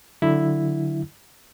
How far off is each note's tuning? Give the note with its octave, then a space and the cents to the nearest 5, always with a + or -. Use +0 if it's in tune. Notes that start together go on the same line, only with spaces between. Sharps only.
D3 +0 F#3 +0 E4 +0